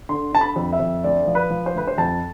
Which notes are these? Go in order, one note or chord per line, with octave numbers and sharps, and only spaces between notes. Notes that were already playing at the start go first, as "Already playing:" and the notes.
D3 C6
D3 A5
B5
F2
E5
F2
D2 D5
F3
B4
F3
C5
D2 B4
C5
F2 A5